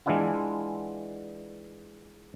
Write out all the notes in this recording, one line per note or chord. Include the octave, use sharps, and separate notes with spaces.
E3 G#3 B3 D4 E4 F4